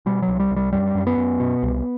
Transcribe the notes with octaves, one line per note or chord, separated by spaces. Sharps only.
B2 G3
F#3
C2
G3
C2
G3
F#2 G3
F#2
B3
F#2
B2
C2